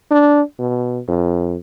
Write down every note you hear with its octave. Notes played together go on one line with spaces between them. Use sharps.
D4
B2
F2